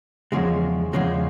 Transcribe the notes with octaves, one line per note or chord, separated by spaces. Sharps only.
E2 C#3 F3 G#3
E2 C#3 F3 G#3